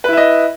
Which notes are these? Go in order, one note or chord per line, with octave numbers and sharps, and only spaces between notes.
E4 B4 D#5 E5